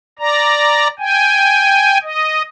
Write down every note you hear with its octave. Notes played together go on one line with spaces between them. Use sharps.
D5 A#5
G5 G#5
D#5